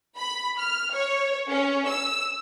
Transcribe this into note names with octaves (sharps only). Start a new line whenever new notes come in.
B5
F6
C#5
C#4
E6